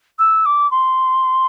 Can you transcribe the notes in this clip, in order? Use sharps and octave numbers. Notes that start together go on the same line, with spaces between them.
E6
D6
C6